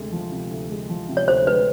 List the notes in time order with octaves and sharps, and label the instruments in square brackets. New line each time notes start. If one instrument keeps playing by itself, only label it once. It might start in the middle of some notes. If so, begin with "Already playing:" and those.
Already playing: [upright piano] D2 C3 G#3
F3
C3
D2
G#3
F3
C3
[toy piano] C#5
[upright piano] D2 [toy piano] C5
[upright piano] G#3 [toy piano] B4